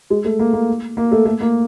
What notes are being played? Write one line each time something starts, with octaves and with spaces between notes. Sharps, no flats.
G#3
A3
A#3
A#3
A#3
A3
A3
A#3